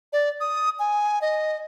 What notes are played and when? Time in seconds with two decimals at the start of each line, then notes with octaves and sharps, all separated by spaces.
0.13 D5
0.40 D#6
0.79 G#5
1.22 D#5